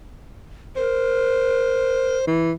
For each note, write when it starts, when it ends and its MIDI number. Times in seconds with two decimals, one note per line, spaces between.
0.76 2.17 70
0.76 2.25 72
2.27 2.51 52